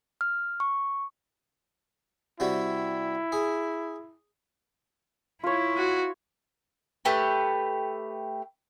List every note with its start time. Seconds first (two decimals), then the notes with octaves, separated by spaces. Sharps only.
0.21 F6
0.60 C#6
2.40 C3 G3 E4 F#4
3.32 G#4
5.44 E4 F4 C#5
5.77 F#4
7.05 A3 G4 B4